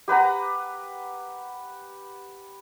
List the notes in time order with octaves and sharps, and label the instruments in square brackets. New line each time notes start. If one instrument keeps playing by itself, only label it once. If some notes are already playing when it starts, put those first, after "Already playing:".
[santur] G4 B4 F#5 A#5